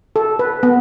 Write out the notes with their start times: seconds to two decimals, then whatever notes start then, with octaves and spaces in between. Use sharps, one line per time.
0.16 A4
0.39 B4
0.63 B3